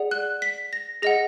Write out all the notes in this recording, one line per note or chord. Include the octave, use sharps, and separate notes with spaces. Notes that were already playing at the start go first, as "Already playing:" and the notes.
Already playing: G#4 D5 F#5
F#6
B6
A#6
G#4 D#5 F#5 A#6